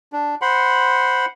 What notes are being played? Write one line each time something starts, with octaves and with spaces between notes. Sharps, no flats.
D4
C5 F#5 B5 C6